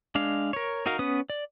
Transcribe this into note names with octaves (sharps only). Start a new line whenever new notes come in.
G#3 D4 F5
A#4 C#5
D#4 F#4 A#4 F5
B3 C#4 B4 D#6
D5